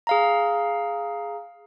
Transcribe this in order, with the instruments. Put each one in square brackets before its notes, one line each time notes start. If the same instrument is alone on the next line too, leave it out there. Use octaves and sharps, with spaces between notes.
[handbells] G#4 F5 A#5